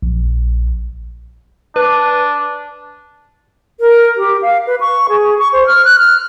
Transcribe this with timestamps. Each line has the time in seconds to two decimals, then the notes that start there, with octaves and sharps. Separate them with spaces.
0.03 A#1
1.76 D4 B4
3.80 A#4
4.17 G4
4.42 F5
4.67 B4
4.81 C#6
5.09 G#4
5.39 C#6
5.53 C5
5.67 F6
5.85 F#6
5.99 F6